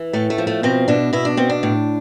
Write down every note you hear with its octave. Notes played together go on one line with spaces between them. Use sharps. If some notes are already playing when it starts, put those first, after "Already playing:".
Already playing: E3
A2 A3
A3
F3
A3
B2 C4
B2 D4
B2 E4
D4
B2 C4
D4
A2